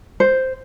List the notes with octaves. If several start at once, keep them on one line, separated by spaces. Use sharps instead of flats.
C5